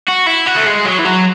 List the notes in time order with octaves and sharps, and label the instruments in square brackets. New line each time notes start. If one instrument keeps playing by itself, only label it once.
[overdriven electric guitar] F#4
E4
F#4
A3
G#3
F#3
E3
F#3